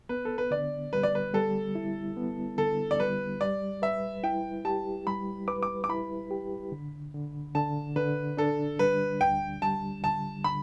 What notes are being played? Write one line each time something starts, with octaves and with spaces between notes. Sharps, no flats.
B3 B4
A4
B4
D3 D5
G3 B4
D5
B4
G3 A4
E4
B3
D3 A4
D5
G3 B4
G3 D5
B4 E5
E4 G5
G4 A5
G3 B5
B4 D6
D6
D6
E4 B5
G4
D3
D3
D3 A5
D3 B4
D4 A4
G3 B4
D2 G5
G3 A5
D3 A5
D3 B5